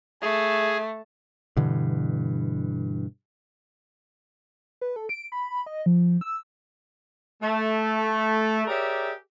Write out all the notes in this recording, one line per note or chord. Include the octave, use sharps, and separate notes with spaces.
A3 G#4
G2 B2 D3 E3
B4
A4
D7
B5
D#5
F3
E6
A3
G4 G#4 A#4 C#5 D5 E5